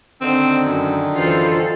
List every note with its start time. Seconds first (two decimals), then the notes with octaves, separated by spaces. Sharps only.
0.21 D3 D#3 C4
0.65 F#2
1.14 F#2 E3 F4 A4 C5